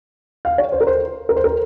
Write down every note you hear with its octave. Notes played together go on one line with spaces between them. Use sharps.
F5
C#5
C5
A#4
C5
A#4
C5
A#4